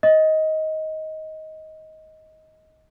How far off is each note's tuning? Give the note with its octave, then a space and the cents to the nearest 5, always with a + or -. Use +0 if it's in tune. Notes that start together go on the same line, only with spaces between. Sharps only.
D#5 +15